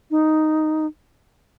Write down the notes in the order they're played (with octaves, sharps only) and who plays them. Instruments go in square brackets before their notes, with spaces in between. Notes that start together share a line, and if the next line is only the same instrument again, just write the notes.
[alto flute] D#4